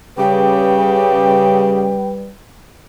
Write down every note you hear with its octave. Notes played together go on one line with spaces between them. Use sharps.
C#3 G3 G4 B4 G5